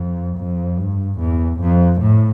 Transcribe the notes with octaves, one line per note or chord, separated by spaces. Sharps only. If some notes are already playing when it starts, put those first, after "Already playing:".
Already playing: F2
F2
G2
E2
F2
A2